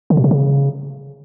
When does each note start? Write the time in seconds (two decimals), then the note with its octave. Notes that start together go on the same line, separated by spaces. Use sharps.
0.10 D3
0.17 B2
0.24 C3
0.31 C#3